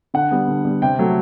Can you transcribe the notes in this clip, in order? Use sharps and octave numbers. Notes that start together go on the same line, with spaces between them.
D3 F#5
G3 B3
D3
G3 B3
C3 G5
F#3 A3